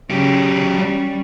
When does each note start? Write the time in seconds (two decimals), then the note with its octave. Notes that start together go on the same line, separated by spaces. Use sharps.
0.11 C#3 F#3 G4
0.74 G3 C#4